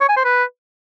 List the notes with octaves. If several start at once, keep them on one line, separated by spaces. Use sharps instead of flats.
C#5
G#5
C5
B4